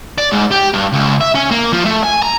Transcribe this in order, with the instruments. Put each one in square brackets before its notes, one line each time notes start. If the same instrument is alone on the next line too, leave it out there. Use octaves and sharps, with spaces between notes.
[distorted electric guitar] D5
G#2
G4
G2
C#2
E5
C#4
A#3
F3
A3
G#5
A#5